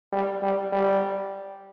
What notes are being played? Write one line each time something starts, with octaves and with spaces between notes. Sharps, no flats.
G3
G3
G3